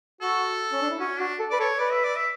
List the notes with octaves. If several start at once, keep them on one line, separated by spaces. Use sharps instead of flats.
F#4 A4
C#4
D4
E4
C#4 F#4
D4 F#4
A4
B4 D5
A4 C#5
B4 D5
E5
D5
E5